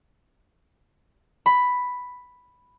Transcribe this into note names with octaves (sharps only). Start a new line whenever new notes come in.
B5